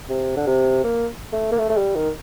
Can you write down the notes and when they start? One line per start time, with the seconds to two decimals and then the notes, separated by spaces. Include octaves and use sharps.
0.09 C3
0.37 D3
0.47 C3
0.84 A#3
1.33 A3
1.52 A#3
1.58 A3
1.69 A3
1.77 G3
1.96 D#3